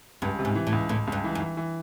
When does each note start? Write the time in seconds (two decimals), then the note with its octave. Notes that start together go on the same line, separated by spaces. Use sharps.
0.22 C#2 G2
0.39 C3
0.45 G#2
0.55 E3
0.67 A2
0.72 C#2
0.89 C#2 A2
1.07 C#2
1.12 G2
1.24 E3
1.35 F#2
1.40 E3
1.57 E3